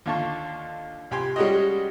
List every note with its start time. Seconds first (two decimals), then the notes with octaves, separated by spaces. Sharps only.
0.06 D#2 D3 F4 A5 C#6
1.11 C2 G4 G#5 C6
1.36 G3 G#3 C#4 F#4 G4 D#5